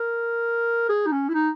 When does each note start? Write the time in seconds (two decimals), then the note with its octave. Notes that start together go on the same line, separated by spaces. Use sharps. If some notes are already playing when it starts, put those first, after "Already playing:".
Already playing: A#4
0.89 G#4
1.06 D#4
1.12 C#4
1.29 E4
1.34 D#4